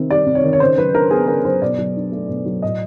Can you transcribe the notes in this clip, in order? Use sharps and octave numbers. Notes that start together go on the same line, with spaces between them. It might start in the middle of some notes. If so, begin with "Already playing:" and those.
Already playing: C3 D#3 C4
G3 D5
C3
C#5
D#3
C#5
C#3 C5
F#3 B4
D4 A#4
B3 G#4
C#3 A#4
F#3 C5
B2 D5
F#3
D4
A3
B2
F#3
A2 D#5